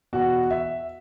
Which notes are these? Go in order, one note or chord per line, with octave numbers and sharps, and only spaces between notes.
E2 B2 B3 F#4
E5